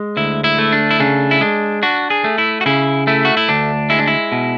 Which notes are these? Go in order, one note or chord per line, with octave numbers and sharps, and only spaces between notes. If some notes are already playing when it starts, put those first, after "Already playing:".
Already playing: G#3
D2 E4
E4
A3
D4
E4
C#3 D4
E4
G#3 D4
D4 F#4
G#4
A3
E4
F#4
C#3 E4
A3 E4
F#4
E4
D2 D4
G#3 E4
D4
E4
B2